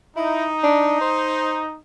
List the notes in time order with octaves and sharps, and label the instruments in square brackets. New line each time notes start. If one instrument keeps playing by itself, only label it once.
[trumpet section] D#4 [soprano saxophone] E4
[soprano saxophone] D4
C5